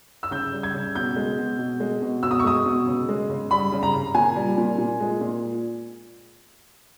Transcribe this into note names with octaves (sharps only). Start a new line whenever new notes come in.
E6
C#3 G6
G3
G#6
C#3
B2 G6
G#3
B2
B2
G#3
B2
B2 E6
D#6
C#6
G#3 D#6
B2
C#3
G#3
C#3
G3 B5
C#3
A#5
C#3
A#2 G#5
G3
A#2
A#2
G#3
A#2